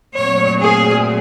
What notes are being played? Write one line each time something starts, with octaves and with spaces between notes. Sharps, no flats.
A#2 F#3 A3 C4 C#5
G#4